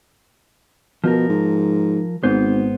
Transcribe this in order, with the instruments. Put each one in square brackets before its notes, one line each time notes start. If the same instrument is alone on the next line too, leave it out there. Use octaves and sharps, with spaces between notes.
[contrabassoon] B2 [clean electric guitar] F3 A#4
[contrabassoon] G#2
[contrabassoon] G#1 [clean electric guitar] G#2 B3 C5